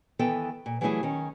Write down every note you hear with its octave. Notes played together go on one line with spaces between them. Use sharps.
D#3 E3 B3 A4 G5
A#2
E3 F#3 G3 A3 E4 G#4
D#3 C#4